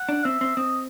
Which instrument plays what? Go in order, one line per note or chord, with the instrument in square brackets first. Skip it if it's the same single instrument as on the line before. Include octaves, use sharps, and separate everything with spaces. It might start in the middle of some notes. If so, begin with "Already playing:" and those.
Already playing: [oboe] F#5
[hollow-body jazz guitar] D4
[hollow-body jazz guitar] C4 [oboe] E5
[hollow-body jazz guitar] C4
[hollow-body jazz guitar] C4 [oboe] D#5